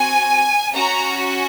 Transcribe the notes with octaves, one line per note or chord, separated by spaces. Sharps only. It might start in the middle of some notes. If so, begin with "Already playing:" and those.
Already playing: C4 F#4 G#5
C#4 F#4 A#5